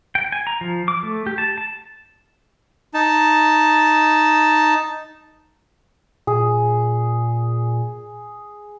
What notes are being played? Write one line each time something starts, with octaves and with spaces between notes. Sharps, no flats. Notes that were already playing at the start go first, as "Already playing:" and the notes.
G5
G#5
A#5
F3
D6
A3
G4
A5
A5
D#4 A5
A#2 G#4